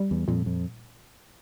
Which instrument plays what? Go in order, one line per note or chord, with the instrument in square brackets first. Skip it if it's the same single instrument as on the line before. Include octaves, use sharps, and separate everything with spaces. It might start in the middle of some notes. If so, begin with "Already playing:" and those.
Already playing: [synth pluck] G3
[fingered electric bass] E2
[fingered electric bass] F2 [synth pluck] A#2
[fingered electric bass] F2